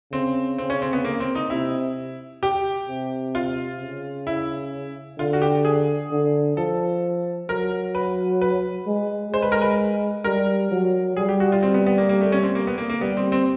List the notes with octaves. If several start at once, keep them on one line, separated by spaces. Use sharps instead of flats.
C#3 C4
C4
C#4
C4
B3
A#3
C4
D#4
C3 E4
G4
C3
F4
C#3
E4
D3 F4
F#4
G4
G#4
D3
F3 A4
F#3 A#4
B4
B4
G#3
G#3 C5
B4
A#4
B4
G3 A#4
F#3
G3 G#4
G4
F#4
F4
C4
B3
B3
A#3
A#3
A3
C#4
C4
A#3
B3
A#3
A#3
G3 B3
C4
C4